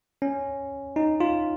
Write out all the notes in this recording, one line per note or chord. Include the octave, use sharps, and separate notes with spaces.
C#4
D#4
F4